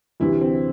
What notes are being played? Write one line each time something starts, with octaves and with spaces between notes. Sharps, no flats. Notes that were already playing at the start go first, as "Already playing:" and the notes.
D2 C3 E3 G3 E4
C4